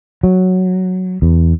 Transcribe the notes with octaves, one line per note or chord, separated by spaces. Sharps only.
F#3
E2